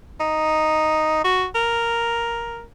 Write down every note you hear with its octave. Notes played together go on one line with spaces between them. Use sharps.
D#4
F#4
A#4